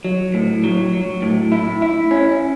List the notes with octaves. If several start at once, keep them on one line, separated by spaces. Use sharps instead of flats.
F#3
A2
F#3
F#3
A2
E4
E4
C#4